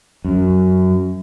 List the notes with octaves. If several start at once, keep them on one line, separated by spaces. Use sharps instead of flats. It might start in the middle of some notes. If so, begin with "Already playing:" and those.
F#2